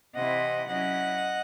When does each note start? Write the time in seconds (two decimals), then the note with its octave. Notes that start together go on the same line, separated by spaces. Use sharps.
0.14 C3 E3 C4 E4 D#5 F#5
0.68 F#3 C#4 E4 D#5 F#5